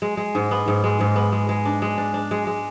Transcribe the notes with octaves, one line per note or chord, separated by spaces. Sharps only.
G#3
G#3
G#2
B3
G#2
G#3
G#2
B3
G#3
G#3
D4
G#3
D4
D4
G#3
G#3